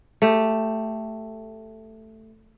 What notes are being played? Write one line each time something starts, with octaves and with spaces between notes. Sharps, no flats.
A3 G4